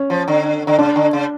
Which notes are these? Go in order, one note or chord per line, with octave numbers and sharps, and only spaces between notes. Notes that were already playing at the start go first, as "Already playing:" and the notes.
Already playing: C#4
F3
D3
D3
C#3 D4
D3
C#3